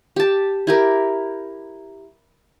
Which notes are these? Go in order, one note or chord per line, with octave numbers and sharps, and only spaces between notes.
G4 A5
E4 G4 A#4